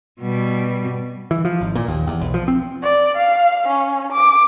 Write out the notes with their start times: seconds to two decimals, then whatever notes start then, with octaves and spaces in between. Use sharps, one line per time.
0.21 B2 G3
1.31 E3
1.45 F3
1.61 G#1
1.75 A#2
1.88 D#2
2.07 E2
2.21 B1
2.34 F3
2.48 C4
2.82 D5
3.17 F5
3.68 C#4
4.12 D6